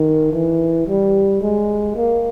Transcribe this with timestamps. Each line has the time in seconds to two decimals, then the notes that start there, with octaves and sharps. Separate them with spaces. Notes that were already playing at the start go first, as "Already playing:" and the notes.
Already playing: D#3
0.33 E3
0.88 G3
1.42 G#3
1.96 A#3